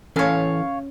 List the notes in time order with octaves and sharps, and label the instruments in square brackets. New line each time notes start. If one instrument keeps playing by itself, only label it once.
[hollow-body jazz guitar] E3 A4 G#5 [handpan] C#4 [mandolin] C#5 F5